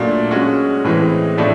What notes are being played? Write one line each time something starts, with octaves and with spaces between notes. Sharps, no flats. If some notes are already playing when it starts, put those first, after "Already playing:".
Already playing: A#2 F#3 A3 D4
G#3 C#4 F#4
A2 E3 G#3 C4
A2 F3 A3 D4